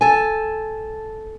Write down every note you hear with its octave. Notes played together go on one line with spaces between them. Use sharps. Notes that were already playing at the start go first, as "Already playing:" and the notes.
A4 G#5